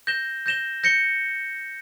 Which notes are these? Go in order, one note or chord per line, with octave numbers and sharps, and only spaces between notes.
G6 A#6 E7 G7
G6 A#6 E7 G7
G6 A#6 C#7 G7